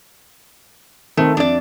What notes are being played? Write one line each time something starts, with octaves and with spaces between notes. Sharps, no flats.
D#3 A3 C4
F2 D4 D5